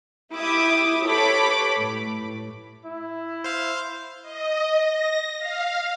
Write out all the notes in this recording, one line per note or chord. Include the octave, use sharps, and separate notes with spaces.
E4 G4 E5 D6 D#6
G4 A4 B4 C#5 B5 D6
A2
E4
C5 F5
D#5
A#6
F5